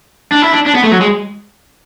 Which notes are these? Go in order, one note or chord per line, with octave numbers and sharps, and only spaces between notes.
D4
E4
D4
D4
B3
A3
F#3
G#3